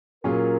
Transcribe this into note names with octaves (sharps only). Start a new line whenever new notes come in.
A#2 F#3 C#4 F4 G#4 A#4